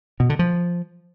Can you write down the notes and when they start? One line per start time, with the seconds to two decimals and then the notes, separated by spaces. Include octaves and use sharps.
0.20 B2
0.30 D3
0.39 F3